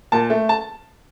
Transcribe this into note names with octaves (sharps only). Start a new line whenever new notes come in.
A#2 A5
A3
A5